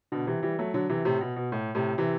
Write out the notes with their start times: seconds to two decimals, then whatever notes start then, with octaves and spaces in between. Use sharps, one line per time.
0.12 B2 D3
0.27 C3 E3
0.43 E3 G3
0.59 F#3 A3
0.74 D3 F#3
0.89 C3 E3
1.05 A2 C3
1.21 B2
1.36 B2
1.52 A2
1.75 A2 C3
1.98 C3 E3